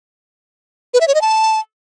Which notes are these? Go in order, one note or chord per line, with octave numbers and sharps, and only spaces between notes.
B4
E5
C#5
D#5
A5